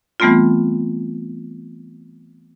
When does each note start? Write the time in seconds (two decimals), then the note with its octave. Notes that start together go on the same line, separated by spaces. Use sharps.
0.20 E3 G3 A3 B3 C4 F4